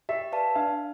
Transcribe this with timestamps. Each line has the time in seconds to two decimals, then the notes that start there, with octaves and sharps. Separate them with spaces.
0.09 G4 E5
0.32 B4 D5 F5 A5
0.55 D4 F5